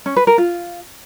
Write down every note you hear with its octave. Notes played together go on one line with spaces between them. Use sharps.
C#4
B4
A#4
F4